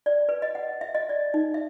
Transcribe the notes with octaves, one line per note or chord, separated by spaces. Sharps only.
D5
B4
D#5
F#5
E5
D#5
D5
D#4
E5